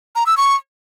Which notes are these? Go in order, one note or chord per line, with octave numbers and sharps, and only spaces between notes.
A#5
E6
C#6